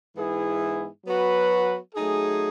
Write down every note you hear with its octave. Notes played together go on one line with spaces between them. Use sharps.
G#2 E3 B3 E4 G#4
F#3 B3 F#4 B4
F#3 A3 D#4 G#4